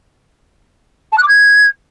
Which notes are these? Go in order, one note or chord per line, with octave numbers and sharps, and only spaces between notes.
A5
F#6
D6
G#6